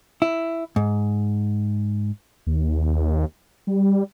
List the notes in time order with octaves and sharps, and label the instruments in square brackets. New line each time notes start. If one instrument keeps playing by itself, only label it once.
[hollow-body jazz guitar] E4
G#2
[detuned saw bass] D#2
G3